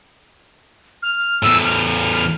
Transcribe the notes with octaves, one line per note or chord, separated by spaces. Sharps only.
F6
E2 A2 E6
F6